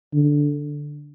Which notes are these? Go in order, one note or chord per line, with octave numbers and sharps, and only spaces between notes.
D3